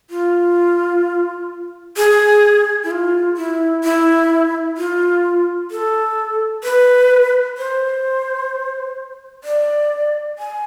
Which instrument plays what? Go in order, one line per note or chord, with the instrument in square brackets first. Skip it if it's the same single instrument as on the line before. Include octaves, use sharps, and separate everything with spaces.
[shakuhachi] F4
G#4
E4
F4
E4
E4
F4
A4
B4
C5
D5
G#5